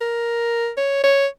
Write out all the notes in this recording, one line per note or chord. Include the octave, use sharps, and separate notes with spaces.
A#4
C#5
C#5